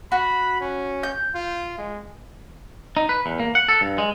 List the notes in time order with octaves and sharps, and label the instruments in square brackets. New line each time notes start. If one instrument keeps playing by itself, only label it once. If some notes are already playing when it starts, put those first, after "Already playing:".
[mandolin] F#4 [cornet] B5
[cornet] C#4
[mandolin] G6
[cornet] F4
G#3
[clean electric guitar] D#4
B4
E2
A#3
F#5
A4
G2
G#3